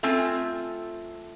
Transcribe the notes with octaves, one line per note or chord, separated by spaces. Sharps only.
A3 C4 F4 G#5